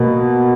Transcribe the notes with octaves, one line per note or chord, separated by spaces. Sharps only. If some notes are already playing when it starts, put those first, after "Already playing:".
Already playing: B2 A#3